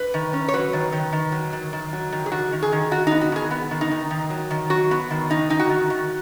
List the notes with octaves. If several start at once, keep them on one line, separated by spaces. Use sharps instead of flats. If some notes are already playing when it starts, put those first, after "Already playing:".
Already playing: B4
D#3
C#4
C#5
F#3 B4
D#3
D#3
D#3
F#3
D#3
D#3
F#3
D#3
G#4
D#3 F#4
D#3
G#4
D#3
D#3 F#4
B3 D#4
F#4
D#3 G#4
B3
D#3
D#4
D#3
D#3
F#3
D#3
F#3 F#4
B3
D#3
D#3 D#4
D#3 D#4
F#4
D#3
D#3